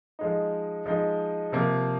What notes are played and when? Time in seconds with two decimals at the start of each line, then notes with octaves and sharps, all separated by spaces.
0.19 F3 G#3 D#4
0.86 F3 G#3 D#4
1.52 C3 F3 A#3